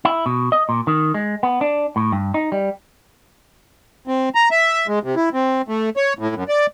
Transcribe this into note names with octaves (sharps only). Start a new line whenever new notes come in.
E4
B2
D#5
A#2
D#3
G#3
B3
D4
A2
G2
D#4
G3
C4
A#5
E5
G#3
C3
E4
C4
A3
C#5
A2
F#2
D5